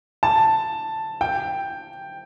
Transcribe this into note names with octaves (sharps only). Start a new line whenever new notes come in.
A5
G5